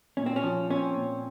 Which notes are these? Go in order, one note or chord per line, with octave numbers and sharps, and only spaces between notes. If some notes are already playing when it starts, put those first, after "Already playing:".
A#2 C#4
C4
C#4
F3
C4 C#4
A#2